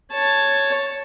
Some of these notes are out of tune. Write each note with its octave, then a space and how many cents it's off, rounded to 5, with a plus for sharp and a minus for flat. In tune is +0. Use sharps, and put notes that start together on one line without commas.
C#5 +0 A5 +0